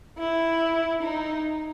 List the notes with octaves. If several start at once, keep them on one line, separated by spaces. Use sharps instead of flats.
E4
D#4